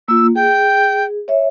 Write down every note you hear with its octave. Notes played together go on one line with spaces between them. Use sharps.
A#3 F4 E6
G#4 G5
C#5 E5